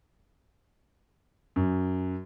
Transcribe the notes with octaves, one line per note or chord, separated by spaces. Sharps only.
F#2